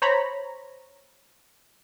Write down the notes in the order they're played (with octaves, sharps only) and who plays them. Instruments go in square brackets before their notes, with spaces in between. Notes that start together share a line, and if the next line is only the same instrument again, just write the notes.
[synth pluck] C5 C#5 A#5 B5